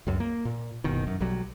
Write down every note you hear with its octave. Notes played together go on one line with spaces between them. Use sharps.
C#2 F#2
A#3
A#2
F#1 B2 D#3
F#2
B1 F#3 G3